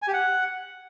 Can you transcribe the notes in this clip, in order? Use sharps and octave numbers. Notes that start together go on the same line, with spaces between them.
G#5
G4
F#5